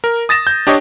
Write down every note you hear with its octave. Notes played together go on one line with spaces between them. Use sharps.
A#4
D#6 A6 A#6 E7
G6
D4 G4 C#5 D#5